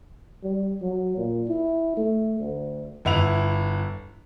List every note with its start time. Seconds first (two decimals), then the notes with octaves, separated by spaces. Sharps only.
0.43 G3
0.82 F#3
1.17 A#2
1.48 E4
1.97 A3
2.40 D2
3.05 G1 E4 F#5 F7